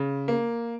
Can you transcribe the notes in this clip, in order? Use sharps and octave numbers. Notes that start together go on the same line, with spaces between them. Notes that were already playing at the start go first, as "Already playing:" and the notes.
Already playing: C#3
A#3